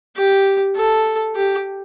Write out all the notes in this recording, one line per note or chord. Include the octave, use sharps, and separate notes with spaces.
G4
A4
G4